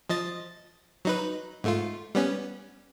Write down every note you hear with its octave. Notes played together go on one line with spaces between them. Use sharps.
F3 D#5 A6
F#3 D#4 B4
G#2 A3 F4
G3 B3 C#4